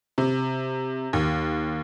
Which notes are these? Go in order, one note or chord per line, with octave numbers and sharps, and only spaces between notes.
C3
D#2